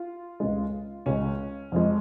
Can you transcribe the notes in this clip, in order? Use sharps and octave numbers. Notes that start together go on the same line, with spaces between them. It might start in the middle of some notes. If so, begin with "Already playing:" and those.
Already playing: F4
C#2 C#3 G#3
C#2 C#3 G#3 C#4
F2 F3 G#3